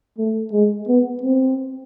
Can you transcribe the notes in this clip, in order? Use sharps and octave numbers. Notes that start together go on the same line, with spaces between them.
A3
G#3
B3
C4